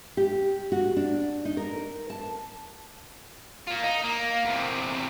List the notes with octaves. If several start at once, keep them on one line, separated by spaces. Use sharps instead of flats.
G4
F#4
D4
D#4
A#4
A5
A#3 F4
D#4
A#3
E2 C3